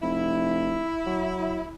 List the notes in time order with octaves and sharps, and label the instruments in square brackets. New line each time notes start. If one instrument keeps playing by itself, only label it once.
[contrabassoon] F1 [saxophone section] E4
[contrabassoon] F#3